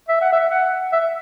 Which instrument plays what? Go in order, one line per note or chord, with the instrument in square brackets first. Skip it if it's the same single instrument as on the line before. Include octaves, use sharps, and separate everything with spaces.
[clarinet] E5
F#5
E5
F#5
E5